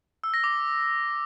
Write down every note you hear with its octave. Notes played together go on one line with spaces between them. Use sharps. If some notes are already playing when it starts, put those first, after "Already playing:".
E6
A#6
D6